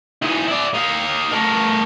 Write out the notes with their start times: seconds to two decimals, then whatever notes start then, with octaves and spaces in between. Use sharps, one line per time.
0.22 E3 D#4
0.47 E4 D5
0.74 D#4 F5
1.31 A3 A#4